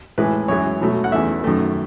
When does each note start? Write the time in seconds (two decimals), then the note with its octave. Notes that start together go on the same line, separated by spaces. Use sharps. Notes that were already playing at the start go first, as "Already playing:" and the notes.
0.18 A2 E3 G#3 B4
0.48 F#2 E3 G#3 C#5
0.81 B2 F#3 A3
1.04 F#5
1.12 E2 C#3 E3 A3 E5
1.44 F#2 D#3 A3